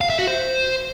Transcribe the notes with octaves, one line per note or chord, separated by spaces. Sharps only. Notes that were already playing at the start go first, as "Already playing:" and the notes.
F5
E5
F#4
C5